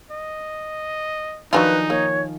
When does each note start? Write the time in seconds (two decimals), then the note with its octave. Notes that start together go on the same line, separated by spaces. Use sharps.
0.11 D#5
1.53 D#3 F3 F#3 D4 D#4 F4 B4 G#5
1.90 A#3 C#5